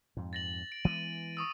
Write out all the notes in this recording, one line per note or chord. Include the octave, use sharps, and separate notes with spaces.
F2 G#2
A6 A#6 F#7
D7
E3 G#3 B3 D#7
C#6 D#6 E6